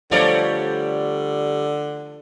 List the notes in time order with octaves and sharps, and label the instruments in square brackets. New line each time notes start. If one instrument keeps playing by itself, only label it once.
[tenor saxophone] D3 [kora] F3 A3 A#4 [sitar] G3 C#5 D5